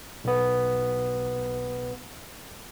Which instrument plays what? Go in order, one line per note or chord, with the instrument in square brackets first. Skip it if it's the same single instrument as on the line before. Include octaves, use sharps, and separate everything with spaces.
[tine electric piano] B1 B3